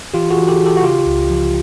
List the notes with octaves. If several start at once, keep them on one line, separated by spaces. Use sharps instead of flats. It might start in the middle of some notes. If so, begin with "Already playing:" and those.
E3 F4 G4
F#4 G#4
E3
G4 A4
E3
G4 A4
F#4
C#3 F4 G4
C#2
F3